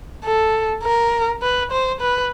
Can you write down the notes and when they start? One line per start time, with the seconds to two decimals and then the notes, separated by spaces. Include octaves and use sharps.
0.24 A4
0.83 A#4
1.42 B4
1.71 C5
2.00 B4